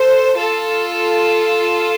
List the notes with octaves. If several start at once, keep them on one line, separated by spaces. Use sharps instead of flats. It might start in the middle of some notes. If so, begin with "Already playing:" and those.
Already playing: A4 C5
F4 A4